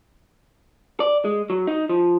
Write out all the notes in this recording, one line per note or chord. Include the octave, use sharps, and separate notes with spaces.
D5
G#3
F#3
D#4
F3